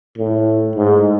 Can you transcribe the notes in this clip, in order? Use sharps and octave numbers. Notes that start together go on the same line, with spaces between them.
A2
G#2